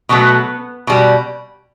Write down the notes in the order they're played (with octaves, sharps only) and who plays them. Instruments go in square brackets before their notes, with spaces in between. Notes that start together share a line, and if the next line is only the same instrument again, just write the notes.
[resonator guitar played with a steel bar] B2 F#3 A3 B3
B2 G3